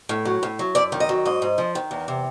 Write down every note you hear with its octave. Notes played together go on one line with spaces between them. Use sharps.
A2
F#3
A2
F#3
F#2 D5
D#3
D#5
F#3
G#2 D#5
G#2
F3
D#3
E2
C3